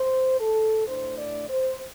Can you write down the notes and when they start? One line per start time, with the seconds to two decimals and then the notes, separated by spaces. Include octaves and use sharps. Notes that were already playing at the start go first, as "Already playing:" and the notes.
Already playing: C5
0.40 A4
0.87 A2 A3 D4 C5
1.18 D5
1.49 C5